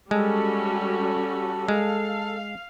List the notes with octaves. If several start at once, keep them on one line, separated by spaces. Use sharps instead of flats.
G3 G#3 C#4 F#4 A4
G#3 F5